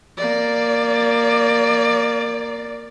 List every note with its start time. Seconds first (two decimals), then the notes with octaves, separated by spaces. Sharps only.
0.18 A#3 D5